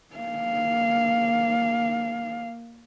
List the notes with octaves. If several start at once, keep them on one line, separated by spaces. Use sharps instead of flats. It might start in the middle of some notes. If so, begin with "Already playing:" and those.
A#3 F5